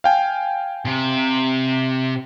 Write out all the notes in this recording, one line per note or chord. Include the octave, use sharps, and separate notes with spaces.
F5 G5 G#5
C3